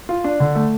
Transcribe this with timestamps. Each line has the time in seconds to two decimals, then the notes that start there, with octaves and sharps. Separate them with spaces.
0.09 F4
0.24 D4
0.40 D3
0.55 A3